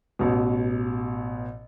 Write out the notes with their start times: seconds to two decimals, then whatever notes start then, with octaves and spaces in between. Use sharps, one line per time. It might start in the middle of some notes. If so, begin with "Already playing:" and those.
0.19 A1 B2